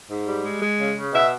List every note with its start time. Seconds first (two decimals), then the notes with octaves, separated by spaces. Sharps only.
0.08 G#2
0.26 G3
0.43 G#3
0.60 G#3
0.78 C#3
0.95 C#3
1.12 B2 E5